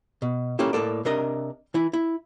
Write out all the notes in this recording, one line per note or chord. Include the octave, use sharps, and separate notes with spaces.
B2
A#3 C#4 E4 G4 A4
A2 A#3 A4 D5
C3 D4 A#4 D#5
E3 E4
E4